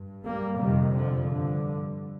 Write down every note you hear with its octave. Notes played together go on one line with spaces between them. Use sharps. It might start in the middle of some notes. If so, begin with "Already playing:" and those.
Already playing: G2
G3 A#3
F2 C3 D#3 G3
D3 F3
G2 D3